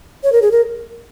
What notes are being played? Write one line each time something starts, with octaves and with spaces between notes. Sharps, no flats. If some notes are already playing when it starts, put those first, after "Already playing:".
C#5
A#4
G#4
A#4